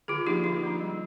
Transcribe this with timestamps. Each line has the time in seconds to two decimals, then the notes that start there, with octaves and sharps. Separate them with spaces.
0.08 D3 F4 G#4
0.26 F3 A#3 D4 D#4 G4
0.44 D3 D#4
0.62 F3 A#3 D4
0.80 G3